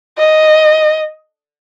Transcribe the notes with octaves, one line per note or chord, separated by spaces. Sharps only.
D#5